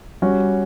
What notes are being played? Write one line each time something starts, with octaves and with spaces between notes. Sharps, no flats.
G3 C#4 F#4